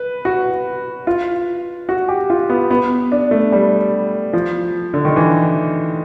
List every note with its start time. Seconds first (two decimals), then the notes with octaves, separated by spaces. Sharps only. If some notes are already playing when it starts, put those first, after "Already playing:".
Already playing: B4
0.25 F#4
1.07 F4
1.89 F#4
2.08 G4
2.30 F4
2.50 B3
2.71 B3
3.12 D4
3.31 A3
3.52 G3
4.33 F3
4.94 D3
5.05 D#3
5.16 E3